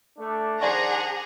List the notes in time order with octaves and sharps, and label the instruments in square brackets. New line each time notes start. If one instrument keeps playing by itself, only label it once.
[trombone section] A3 [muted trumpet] D4
[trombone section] D#3 C5 [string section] G#4 F#5 A#5 [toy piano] D5 G#5 C#6